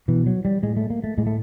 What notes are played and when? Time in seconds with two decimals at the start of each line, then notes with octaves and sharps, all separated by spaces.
0.08 B2 E3
0.26 F#3
0.45 G3
0.63 A2 G#3
0.77 A3
0.90 A#3
1.04 A3
1.18 A2 G#3
1.27 A3